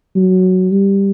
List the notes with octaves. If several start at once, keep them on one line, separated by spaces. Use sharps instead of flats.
F#3
G3